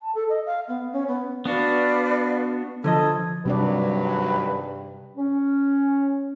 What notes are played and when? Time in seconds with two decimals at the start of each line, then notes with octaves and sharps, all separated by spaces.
0.01 A5
0.15 A4
0.29 D#5
0.46 F5
0.68 B3
0.93 C#4
1.08 B3
1.45 B3 D4 F#4 B4 D5 F5
2.84 D3 F3 A4 D#5 G#6
3.46 G#1 G2 C3 F#3 G3 D4 B4 D5
5.17 C#4